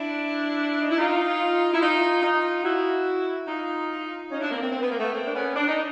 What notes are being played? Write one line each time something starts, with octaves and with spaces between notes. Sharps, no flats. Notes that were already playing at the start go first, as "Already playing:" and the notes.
Already playing: D4 E4
D#4
E4
D#4 F4
E4
D#4 F4
D#4 F4
E4 F#4
D#4 F4
C#4 D#4
D4 E4
A#3 C4
A#3 C4
C4
B3
A#3
A3 B3
A#3 C4
D4
B3 C#4
D4
D#4